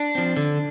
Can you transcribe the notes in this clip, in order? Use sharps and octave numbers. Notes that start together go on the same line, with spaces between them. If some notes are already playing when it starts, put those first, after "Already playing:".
Already playing: D4
F3 C4
D3